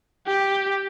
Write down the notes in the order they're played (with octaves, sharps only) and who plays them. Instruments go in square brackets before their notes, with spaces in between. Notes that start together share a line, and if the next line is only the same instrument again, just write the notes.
[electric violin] G4